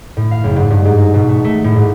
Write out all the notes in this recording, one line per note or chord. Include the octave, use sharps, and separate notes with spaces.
A2
F5
F#1
G#2
G2
G#2
D#4
B2
A3
A3
A2
G#2